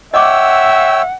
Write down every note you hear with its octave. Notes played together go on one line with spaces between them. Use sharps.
C#5 D#5 E5 F#5 G5 D6 E6